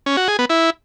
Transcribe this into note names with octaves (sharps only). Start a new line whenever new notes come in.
C#4
F#4
G#4
B3
E4